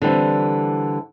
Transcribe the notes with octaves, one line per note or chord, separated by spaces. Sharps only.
D3 E3 G3 C4